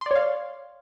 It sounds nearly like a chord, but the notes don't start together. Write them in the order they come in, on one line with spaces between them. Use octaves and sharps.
C6 D5 C#5 F5